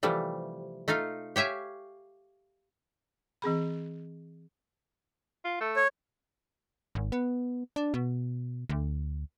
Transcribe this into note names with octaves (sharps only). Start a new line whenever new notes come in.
C3 E3 F3 G3 A3
A3 D#4 F4 F5
G4 C#5 E5 F5 G#5
E3 C4 G#4 B5
F4
A3
C#5
G#1
B3
D4
B2
D2